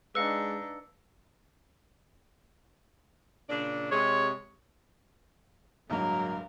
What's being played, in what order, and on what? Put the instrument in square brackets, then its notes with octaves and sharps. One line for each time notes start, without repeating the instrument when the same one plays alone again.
[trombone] G#3 [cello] D4 D#4 [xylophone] B4 F5 [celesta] E6 C#7
[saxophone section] A#2 C#3 D4
[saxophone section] C3 G#3 [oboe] C#5
[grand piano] D1 G2 G#3 [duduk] F#3 [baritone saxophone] A#3 [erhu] A#4